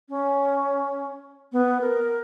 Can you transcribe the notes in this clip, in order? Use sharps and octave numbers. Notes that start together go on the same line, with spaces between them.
C#4
B3
A#4